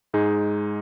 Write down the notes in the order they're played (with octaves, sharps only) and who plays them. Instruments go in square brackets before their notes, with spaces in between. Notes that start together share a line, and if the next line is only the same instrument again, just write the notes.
[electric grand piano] G#2 G#3 D#4 G#4